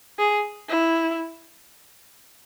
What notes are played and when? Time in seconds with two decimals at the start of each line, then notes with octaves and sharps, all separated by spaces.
0.19 G#4
0.69 E4